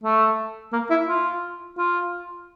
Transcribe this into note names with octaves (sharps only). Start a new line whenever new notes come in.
A3
A#3
E4
F4
F4